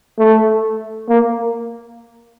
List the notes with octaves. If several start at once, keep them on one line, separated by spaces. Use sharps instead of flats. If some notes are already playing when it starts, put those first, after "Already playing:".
A3
A#3